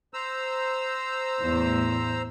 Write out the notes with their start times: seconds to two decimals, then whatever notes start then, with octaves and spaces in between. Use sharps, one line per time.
0.14 C5 A#5 E6
1.41 E2 A2